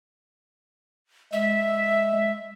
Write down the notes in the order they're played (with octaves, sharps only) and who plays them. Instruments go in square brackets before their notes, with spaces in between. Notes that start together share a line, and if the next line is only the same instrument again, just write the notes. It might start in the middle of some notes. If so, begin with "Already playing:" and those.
[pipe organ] G#3 [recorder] E5